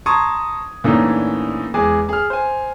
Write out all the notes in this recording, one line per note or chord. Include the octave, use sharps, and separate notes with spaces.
A5 A#5 C6 C#6 D#6 G#6
A#2 D3 E3 A3 C#4 D#4
E2 G#3 G#4 G#5 D6
G#4 F6
C5 G#5